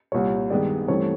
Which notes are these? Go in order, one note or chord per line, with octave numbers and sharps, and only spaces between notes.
C2 A#2 G3 C#5
G2 D#3 G#3 B3 D5
G2 E3 A3 C4 C#5